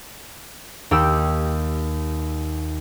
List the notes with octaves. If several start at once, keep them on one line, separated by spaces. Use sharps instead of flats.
D#2 D#4 G4 G5 E6